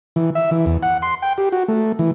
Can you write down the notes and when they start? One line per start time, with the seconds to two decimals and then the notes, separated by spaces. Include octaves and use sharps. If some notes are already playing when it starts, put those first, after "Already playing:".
0.16 E3
0.35 E5
0.51 E3
0.66 E2
0.83 F#5
1.02 C6
1.22 G5
1.38 G4
1.52 F#4
1.68 A3
1.99 E3